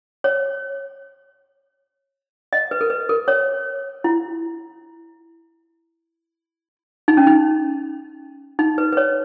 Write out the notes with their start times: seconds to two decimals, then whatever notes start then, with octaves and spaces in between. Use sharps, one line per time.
0.24 C#5
2.53 D#5
2.71 B4
2.81 A#4
2.90 B4
3.09 A#4
3.28 C#5
4.04 E4
7.08 D#4
7.17 C#4
7.27 D#4
8.59 D#4
8.78 B4
8.93 B4
8.97 C#5